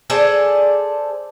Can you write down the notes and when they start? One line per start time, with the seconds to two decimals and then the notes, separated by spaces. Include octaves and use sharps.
0.10 G#4 A4 C5 D5